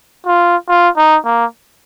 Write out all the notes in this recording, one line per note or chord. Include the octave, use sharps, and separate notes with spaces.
F4
F4
D#4
A#3